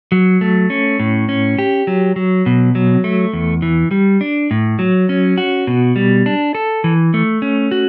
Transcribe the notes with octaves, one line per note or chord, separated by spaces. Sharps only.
F#3
A3
C#4
A2
C#4
G4
F#3
F#3
B2
F#3
A3
E2
E3
G3
D4
A2
F#3
C#4
F#4
B2
G3
D4
A4
E3
A3
C#4
F#4